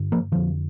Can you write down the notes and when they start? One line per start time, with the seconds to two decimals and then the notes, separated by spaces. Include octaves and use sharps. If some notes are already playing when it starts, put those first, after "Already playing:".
Already playing: G2 D3
0.12 F3 A#3
0.32 F2 D3 F3